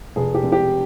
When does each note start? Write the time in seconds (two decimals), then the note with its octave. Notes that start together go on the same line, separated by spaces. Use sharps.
0.16 F1 G#4
0.34 G4
0.43 F1
0.52 G4